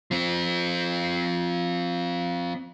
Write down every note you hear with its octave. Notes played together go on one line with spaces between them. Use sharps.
F3 C4